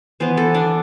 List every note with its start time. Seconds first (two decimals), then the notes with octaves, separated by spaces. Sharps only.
0.20 E3 B3 C5
0.37 A4
0.54 D4